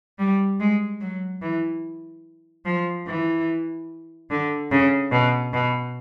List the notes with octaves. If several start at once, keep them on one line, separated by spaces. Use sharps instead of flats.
G3
G#3
F#3
E3
F3
E3
D3
C#3
B2
B2